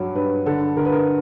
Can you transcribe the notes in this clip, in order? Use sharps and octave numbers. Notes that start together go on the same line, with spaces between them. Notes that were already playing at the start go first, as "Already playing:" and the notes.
Already playing: G2 F#3
G2 B4
D3 A4
D3 A#4
B4
A#4